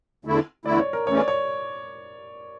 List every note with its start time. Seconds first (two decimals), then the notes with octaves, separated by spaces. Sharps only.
0.25 E2 D3 A3 E4
0.65 E2 D3 A3 E4 D5
0.79 C#5
0.93 A#4
1.07 E2 E3 A3 C#4 C#5
1.17 D5
1.28 C#5